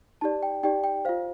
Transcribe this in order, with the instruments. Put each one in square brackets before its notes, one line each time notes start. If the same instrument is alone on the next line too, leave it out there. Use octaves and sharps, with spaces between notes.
[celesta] D#4 G4 D5 A5
G5
D#4 G4 D5 G5
G5
F4 C5 F5